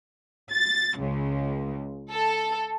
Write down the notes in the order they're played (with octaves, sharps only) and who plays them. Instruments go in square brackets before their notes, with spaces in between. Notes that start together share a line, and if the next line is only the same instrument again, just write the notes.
[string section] A6
C#2
A4